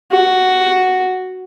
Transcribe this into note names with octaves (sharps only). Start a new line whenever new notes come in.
F#4